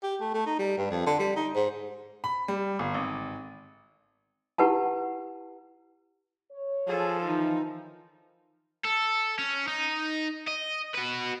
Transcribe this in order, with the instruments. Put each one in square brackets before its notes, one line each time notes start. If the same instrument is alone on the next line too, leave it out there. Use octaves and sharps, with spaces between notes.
[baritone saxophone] G4
A3
A3
D#4
G3
G2
F2
D3
G3
D#4
G#2
[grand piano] B5
G3
G1
G#1
[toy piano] E4 G4 B4 F#5 A5
[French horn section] C#5
[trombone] F3 [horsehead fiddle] G#4 A4
[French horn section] D#3 E3 [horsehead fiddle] D#4
[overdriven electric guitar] A4
C#4
D#4
D#5
F#4 B4